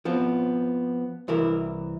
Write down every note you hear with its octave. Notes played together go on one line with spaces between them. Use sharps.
F3 B3 C4
C2 E3 E4 A#4